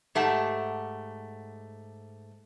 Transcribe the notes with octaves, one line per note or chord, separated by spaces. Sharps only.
G#2 A3 G4 F#5 A5